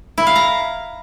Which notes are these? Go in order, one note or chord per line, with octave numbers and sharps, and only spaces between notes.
E4
F5
A#5